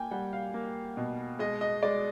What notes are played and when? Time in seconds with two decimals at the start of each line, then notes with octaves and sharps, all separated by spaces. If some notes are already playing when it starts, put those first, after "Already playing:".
Already playing: A#3 G5 G#5
0.11 G3 F#5
0.33 F5
0.54 A#3
0.97 B2
1.39 G#3 D#5
1.61 D#5
1.83 G#3 D5